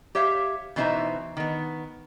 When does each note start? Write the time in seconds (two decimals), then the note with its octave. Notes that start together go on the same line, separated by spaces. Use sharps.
0.15 G4 C#5 E5 F5
0.76 B2 E3 D#4 C5 E5 A#5
1.37 D#3 B3